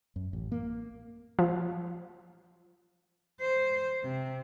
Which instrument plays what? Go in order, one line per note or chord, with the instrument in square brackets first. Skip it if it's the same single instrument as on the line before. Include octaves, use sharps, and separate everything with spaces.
[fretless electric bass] F#2
A1
A#3
[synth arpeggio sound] F3
[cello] C5
C3